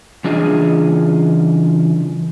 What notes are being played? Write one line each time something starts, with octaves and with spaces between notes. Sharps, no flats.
C#3 E3 D4 F4 G#4 D#5